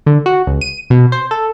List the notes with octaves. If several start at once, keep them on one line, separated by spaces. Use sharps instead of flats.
D3
F#4
C#2
D#7
B2
C5
A4